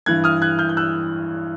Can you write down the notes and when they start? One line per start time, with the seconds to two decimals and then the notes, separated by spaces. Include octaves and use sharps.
0.06 G2 E3 F#6 G#6
0.24 D#6 F6
0.42 F#6 G#6
0.58 F6 G6
0.69 G6
0.77 E6 F#6